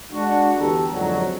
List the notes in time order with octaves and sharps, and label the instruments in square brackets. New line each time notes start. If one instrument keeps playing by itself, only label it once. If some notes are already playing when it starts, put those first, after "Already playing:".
[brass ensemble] G#3 D4 F#4
E2 D3 G4 A4 A#5
F2 G#2 D3 F#3